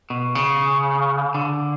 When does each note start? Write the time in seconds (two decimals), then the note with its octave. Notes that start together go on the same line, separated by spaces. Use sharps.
0.10 B2
0.35 C#3
1.35 D3